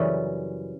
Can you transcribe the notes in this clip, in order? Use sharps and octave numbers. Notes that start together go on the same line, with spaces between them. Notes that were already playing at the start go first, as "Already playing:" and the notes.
Already playing: F#2 C#3 E3 G3 C#4